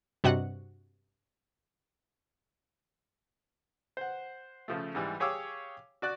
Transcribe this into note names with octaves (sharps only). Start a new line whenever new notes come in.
G2 C3 F#4 D#5 F#5 F#6
C5 F#5
C#3 F3 A3
G#2 E3 G3
G4 G#4 C#5 F5 D6 E6
F#4 D5 F#6